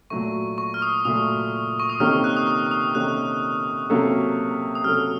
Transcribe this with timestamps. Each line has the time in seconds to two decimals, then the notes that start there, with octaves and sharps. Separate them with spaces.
0.10 A#2 F#3 A3 C#6
0.58 C#6
0.74 F6
0.82 D#6
1.05 A#2 F#3 A3 D#6
1.80 C#6
1.89 D#6
2.00 C3 D#3 A#3 C#4 A4 F6
2.24 F#6
2.37 D#6
2.47 C#6
2.71 D#6
2.95 C3 D#3 A#3 C#4 A4 F#6
3.90 C3 F#3 A#3 C#4 A4
4.75 D#6
4.84 C3 F#3 A#3 C#4 A4 F6